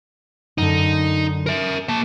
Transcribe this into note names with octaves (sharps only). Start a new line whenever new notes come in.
F#2 D3 D#4
A#4 E5
A#3 A5